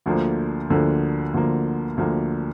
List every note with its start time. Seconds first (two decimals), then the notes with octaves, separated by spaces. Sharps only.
0.06 D2 D3 F3 A#3
0.70 D2 D3 F3 A#3
1.34 D2 D3 F3 A#3
1.97 D2 D3 F3 A#3